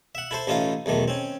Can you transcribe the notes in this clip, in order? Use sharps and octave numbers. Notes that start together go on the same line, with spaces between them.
E5 F#5
E4 A4 C5
A1 A3 C#4 D#4 F4 F5
B1 E2 D#3 A3
C4 C#4